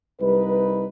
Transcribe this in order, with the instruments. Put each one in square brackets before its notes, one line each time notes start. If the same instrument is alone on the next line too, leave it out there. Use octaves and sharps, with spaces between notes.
[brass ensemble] C2 G3 D#4 B4